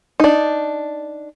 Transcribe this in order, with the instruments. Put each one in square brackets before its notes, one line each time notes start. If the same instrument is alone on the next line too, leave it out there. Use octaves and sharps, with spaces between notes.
[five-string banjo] D4 D#4